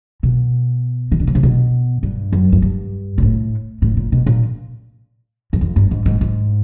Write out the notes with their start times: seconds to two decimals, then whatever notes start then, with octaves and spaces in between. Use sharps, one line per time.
0.23 B2
1.12 D#3
1.20 D3
1.27 C#3
1.35 C3
1.43 B2
2.03 G2
2.32 F#2
2.52 F#2
2.62 G2
3.18 A#2
3.22 A2
3.82 A2
3.97 A#2
4.12 B2
4.26 A#2
5.53 F#2
5.61 F2
5.76 G2
5.91 G#2
6.06 G#2
6.21 G#2